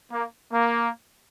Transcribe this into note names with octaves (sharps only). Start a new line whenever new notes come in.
A#3
A#3